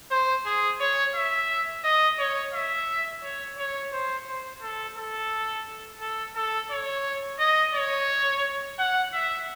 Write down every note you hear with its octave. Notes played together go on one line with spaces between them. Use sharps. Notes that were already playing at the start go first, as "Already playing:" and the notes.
C5
G#4
C#5
E5
D#5
C#5
E5
C#5
C#5
C5
C5
A4
A4
A4
A4
C#5
D#5
C#5
F#5
E5